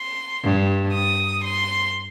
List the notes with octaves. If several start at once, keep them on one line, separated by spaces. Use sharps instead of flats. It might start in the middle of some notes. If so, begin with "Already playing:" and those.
Already playing: C6
G2
D#6
C6